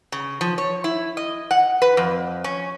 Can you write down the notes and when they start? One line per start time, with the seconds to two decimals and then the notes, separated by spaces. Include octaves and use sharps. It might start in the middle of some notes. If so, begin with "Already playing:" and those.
0.12 C#3
0.41 F3
0.58 C#5
0.84 E4
1.17 D#5
1.51 F#5
1.82 B4
1.97 F2
2.44 C#4